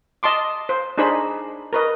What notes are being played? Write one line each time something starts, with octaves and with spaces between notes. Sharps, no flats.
D#5 A5 C6 D6
C5
D4 D#4 G#4 C5 B5
A#4 B4 D#5